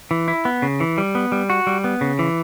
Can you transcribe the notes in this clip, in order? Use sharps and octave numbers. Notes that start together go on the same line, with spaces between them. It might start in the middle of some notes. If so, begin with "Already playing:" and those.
E3
E4
B3
C#3
E3
G3
B3
G3
F#4
G3
B3
C#3
E3